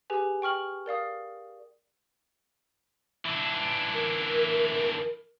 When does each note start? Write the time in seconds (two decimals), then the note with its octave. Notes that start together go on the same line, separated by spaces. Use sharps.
0.10 G4 G#4 B4 G#5
0.42 G5 C#6 F6 F#7
0.86 A#4 D5 F5 D#6
3.26 E3 D4
3.94 A#4